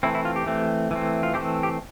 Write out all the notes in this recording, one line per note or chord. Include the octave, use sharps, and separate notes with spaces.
E3 A3 C4 E4
E4
F4
G4
E3 A3 C4
E3 A3 C4
F4
E3 A3 C4 G4
G4